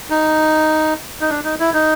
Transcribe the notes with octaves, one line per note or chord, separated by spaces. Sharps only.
D#4
D#4
D4
D#4
E4
D#4